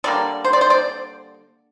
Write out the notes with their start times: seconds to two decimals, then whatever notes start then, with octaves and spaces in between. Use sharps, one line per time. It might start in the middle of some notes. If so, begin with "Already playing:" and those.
0.04 D3 G3 A#3 D5
0.45 C5
0.53 D5
0.61 C5
0.70 D5